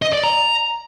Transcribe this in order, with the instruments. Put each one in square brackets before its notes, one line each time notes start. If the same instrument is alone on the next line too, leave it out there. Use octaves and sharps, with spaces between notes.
[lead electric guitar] D#5
D5
A#5